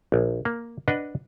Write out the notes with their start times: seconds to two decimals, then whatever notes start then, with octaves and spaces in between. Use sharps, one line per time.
0.12 A#1
0.45 A#3
0.88 D4 B4 D#5 F#5